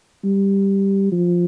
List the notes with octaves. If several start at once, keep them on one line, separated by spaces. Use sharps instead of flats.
G3
F3